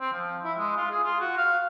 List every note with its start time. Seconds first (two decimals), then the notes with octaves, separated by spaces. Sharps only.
0.01 C4
0.13 F3
0.44 E4
0.58 G#3
0.77 F4
0.91 G#4
1.04 F4
1.20 F#4
1.38 F5